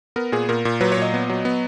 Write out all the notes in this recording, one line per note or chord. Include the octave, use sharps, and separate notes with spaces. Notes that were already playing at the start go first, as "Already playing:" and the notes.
B3 A#4
A#2 G#4
A#2 A#4
A#2
F#3 B4
C#5
A#2 D#5
B3
F#3
B3